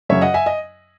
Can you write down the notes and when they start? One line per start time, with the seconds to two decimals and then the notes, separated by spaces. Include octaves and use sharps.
0.09 F#2 C#3 F#3 C#5 E5
0.21 D#5 F#5
0.34 E5 G#5
0.46 D#5